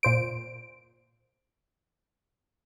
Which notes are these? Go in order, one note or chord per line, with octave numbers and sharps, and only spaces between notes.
A#2 C5 D7